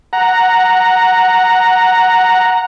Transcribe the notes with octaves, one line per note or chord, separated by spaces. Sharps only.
F#5 A#5